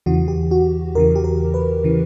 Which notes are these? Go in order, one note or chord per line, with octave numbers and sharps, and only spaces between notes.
E2 C#3 E3 F#4
G4
F#4
E2 C#3 E3 A#4
G4
A#4
B4
C#3 E3